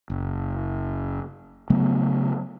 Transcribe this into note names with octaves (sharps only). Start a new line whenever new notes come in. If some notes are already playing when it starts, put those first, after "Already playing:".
F#1
C#3 F#3 A3 B3